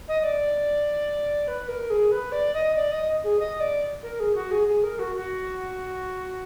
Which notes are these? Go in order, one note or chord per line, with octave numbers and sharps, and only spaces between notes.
D#5
D#5
D5
B4
A#4
G#4
B4
D5
D#5
D5
D#5
G#4
D#5
D5
A#4
G#4
F#4
G#4
G#4
A#4
F#4
F#4